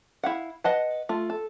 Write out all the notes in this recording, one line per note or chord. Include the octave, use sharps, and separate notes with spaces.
E4 F5 F#5
B4 D#5 F#5 A5
A3 F4
A4